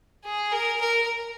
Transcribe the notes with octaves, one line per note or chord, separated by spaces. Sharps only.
G#4
A#4
A#4